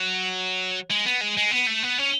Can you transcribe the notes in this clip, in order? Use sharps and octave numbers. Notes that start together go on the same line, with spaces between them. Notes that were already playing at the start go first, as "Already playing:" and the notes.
Already playing: F#3
G#3
B3
G#3
G#3
B3
A3
B3
C#4